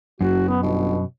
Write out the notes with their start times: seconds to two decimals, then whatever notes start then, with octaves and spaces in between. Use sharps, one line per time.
0.21 F#1 F#2 F#4
0.48 B3
0.63 G1 B2